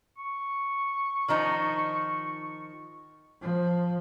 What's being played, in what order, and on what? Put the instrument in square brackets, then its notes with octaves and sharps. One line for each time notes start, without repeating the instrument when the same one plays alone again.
[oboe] C#6
[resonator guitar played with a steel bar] D#3 F3 D#4
[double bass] F3